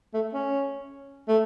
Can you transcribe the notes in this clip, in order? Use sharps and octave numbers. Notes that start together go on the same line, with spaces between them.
A3
C#4
A3